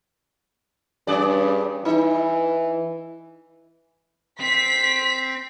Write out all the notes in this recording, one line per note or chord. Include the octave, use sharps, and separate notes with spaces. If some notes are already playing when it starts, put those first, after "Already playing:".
G2 C#4 G#4 D5
E3 D#4
C4 B6